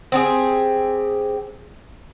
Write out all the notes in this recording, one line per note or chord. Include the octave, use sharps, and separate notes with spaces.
C4 G4 G#4